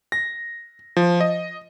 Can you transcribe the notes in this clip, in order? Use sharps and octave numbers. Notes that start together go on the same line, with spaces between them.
A#6
F3
D#5